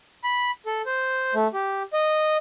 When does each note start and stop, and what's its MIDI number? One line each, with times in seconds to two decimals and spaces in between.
0.24 0.51 83
0.66 0.82 69
0.86 1.34 72
1.34 1.48 57
1.54 1.83 67
1.93 2.37 75